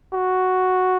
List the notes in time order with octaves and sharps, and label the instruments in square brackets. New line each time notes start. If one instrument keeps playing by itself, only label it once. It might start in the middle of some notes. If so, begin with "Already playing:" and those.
[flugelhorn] F#4